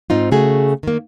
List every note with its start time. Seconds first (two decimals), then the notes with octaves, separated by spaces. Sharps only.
0.10 G#2 C4 D#4 F4
0.32 C#3 A3 F#4 G#4
0.83 D#3 A#3